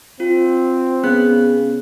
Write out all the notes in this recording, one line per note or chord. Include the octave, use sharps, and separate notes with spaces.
C4 F4
C#3 B3 F#6